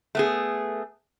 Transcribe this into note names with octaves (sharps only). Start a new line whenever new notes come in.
A3 B3 G#4